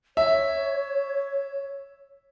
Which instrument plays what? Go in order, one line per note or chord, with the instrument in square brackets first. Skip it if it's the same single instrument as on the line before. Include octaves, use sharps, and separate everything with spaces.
[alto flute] C#5 [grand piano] E5